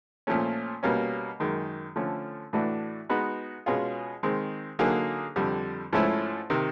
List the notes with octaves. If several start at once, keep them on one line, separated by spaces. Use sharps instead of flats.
A#2 F3 A3 C#4
B2 G3 A#3 C#4
F#2 D#3 G#3
D3 F3 A3 C#4
A2 E3 A3 D4 F#4
G#3 B3 D#4 F#4 B4
B2 G#3 C#4 F4 G#4
D#3 G#3 C4
D3 F#3 A#3 D#4 G#4
F2 D3 G3
G#2 F3 A3 C#4 E4
C3 D#3